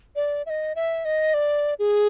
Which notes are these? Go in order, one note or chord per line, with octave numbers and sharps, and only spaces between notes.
D5
E5
D#5
E5
D#5
D5
G#4